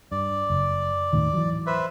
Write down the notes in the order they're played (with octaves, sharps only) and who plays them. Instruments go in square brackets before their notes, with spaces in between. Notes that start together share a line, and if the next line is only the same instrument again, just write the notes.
[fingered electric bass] G2 [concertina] D5
[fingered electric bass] F#1
D#2 A2 D#3
E3 F#3
[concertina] B4 C5 E5